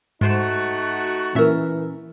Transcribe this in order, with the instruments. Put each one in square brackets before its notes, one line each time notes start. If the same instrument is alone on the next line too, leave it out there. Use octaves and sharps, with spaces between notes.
[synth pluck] G#2 C5 E7 [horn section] A3 D#4 F#4
[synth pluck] A#2 E5 [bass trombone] E3 [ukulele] C#4 A#4